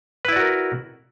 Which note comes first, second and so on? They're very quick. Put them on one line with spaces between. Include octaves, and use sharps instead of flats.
B4 E4 D5 F#4 A#4